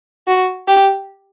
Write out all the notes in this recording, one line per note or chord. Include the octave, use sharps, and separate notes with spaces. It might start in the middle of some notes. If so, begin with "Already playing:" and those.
F#4
G4